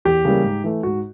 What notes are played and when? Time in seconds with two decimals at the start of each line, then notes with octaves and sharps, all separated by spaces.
0.05 E2 G4
0.25 C#3 E3 G3 A#3
0.44 G#2
0.64 E3 A3
0.83 G#2 F#4